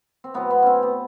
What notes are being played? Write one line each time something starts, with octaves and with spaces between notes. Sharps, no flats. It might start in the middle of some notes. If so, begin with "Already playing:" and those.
C4
A2 F#3 B3
B3
C4 C#4
B3